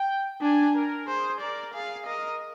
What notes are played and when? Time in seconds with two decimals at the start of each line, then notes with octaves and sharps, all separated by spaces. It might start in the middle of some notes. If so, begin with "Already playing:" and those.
Already playing: G5
0.41 D4 G#5
0.74 A#4
1.07 G#4 C5
1.41 A#4 D5
1.73 G#4 F5
2.06 A#4 D#5